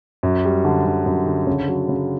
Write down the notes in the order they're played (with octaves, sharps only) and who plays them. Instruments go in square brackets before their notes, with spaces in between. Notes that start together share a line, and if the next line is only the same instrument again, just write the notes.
[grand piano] F#2
G3
D3
D3
F#2
D3
C#3
F#3
C#3